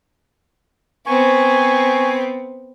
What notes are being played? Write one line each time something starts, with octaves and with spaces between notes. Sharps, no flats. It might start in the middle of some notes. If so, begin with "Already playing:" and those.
B3 C4 G#5 C#6